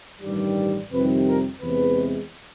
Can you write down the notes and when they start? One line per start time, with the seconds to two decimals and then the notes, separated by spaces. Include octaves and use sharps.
0.22 A1 G2 D#3 G3
0.91 F2 C3 D#3 G3 B4
1.26 A#4
1.61 E2 C3 E3 G#3 B4